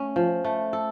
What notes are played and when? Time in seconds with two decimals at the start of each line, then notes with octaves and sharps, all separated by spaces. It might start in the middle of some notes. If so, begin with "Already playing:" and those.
Already playing: A3 C#4
0.16 F3
0.45 A3
0.73 A4